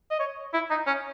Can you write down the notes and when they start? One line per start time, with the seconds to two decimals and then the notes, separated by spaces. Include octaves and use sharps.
0.11 D#5
0.20 C#5
0.54 E4
0.71 D#4
0.87 C#4